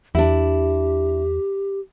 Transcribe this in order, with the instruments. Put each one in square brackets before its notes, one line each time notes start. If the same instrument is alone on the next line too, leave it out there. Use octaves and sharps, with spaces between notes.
[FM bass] E2 [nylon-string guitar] D4 E4 [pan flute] G4